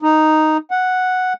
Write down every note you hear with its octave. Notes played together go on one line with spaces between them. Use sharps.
D#4
F#5